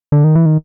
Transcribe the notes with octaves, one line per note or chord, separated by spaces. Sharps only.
D3
D#3
E3
D#3